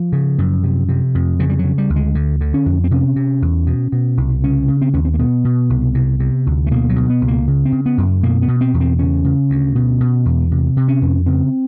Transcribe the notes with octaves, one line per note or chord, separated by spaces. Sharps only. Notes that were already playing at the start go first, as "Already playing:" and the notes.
Already playing: F3
C#3
F#2
C3
C3
F2
C#3 F3
G3
F#3
C#3
G3
D2
G#3
D3
D3
C#4
F2
C4
C3 C#4
C3
E2
B2
B2
C2
C#3 C#4
C#3
C4
D#2 C#4
C4
A#3
B2 B3
B2
C2
C3
C3
D2
A3
B2 A#3
F#3
B2
B3
C#2
A#3
C#3
C4
C#3
B3
F#2
B2 A#3
B3
B2
C4
E2
C4
C#3 C#4
C#3
D2
B2
B2
E2
C3
C3
C#4
F2
C#3 C4